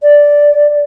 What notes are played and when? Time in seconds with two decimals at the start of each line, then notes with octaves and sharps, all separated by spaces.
0.02 D5